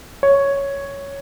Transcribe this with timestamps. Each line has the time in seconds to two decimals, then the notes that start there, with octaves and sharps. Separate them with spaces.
0.23 C#5